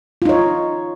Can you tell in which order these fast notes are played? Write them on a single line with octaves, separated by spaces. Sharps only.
F4 D#4 C#5